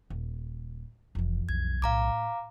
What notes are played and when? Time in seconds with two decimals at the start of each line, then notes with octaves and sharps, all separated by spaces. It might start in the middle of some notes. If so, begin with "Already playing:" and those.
0.10 D#1
1.15 F1 F2 E3
1.49 B1 G#6
1.82 A2 F5 A#5 D6